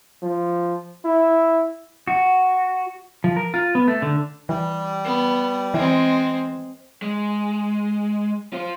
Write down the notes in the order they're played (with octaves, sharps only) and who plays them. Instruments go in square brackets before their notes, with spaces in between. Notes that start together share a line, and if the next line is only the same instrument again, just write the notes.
[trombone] F3
E4
[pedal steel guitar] F#4
[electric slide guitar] F3
A#4
F4
B3
A3
D3
[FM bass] E3 [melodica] G3
[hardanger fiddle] B3
[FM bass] E3 [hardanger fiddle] G#3 C4
[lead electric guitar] G#3
F4 C5